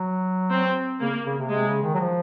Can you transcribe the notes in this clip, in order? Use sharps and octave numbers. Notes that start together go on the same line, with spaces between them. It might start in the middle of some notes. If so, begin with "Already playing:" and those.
Already playing: F#3
C4
C#3 A#3
C#3
C3
C3 G#3
C#3
D#3
F#3
F3